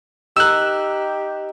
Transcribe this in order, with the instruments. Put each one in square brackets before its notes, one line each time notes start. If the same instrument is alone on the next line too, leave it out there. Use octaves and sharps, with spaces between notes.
[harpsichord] D#4 A#4 [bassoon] G4 [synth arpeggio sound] E6 F#6